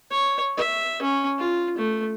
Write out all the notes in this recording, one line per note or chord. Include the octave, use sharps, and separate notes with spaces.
C#5
E5
C#4
F4
A3